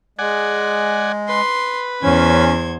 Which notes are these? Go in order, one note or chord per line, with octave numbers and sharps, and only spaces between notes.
G#3 D5 F#5 G#5
B4 C6
E2 C#4 C5 G#6